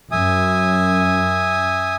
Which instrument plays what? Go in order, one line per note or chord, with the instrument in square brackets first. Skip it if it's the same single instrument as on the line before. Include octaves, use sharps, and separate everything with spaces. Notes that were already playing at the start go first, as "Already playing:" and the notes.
[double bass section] F#2 [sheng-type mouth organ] E5 G#5 D#6